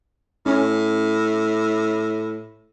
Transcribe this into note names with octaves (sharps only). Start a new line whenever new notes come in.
A2 C#4